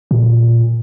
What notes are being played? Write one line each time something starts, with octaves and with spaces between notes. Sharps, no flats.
A#2